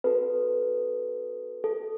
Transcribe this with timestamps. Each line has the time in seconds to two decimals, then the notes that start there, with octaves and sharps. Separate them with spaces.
0.04 C4 F#4 A4 B4
1.64 A4